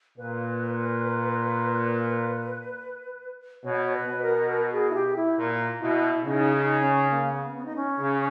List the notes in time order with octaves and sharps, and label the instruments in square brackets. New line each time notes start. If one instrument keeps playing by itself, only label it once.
[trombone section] A#2 [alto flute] B4
[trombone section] B2 [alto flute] C#5
[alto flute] C#5
B4
[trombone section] B2
[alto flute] A#4
A#4
G#4
E4
G4
E4
[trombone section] A#2
[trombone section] B2 [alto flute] E4
[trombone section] C#3 [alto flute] D#4
[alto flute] D#4
C#4
A#3
B3
B3
D#4
C#4
[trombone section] C#3